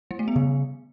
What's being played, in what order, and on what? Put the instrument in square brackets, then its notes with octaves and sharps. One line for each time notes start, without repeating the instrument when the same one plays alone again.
[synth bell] G3
A3
B3
[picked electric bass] C#3